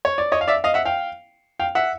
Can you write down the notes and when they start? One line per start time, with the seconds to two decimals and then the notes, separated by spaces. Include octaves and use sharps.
0.05 C#5
0.18 D5
0.32 C#5 D#5
0.41 F5
0.48 D5 E5
0.64 D#5 F5
0.74 E5 F#5
0.85 F5 G5
1.59 F5 G5
1.75 E5 F#5